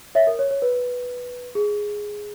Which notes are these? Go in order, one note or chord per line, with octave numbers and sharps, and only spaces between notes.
C#5 E5
A#4
C#5
C#5
B4
G#4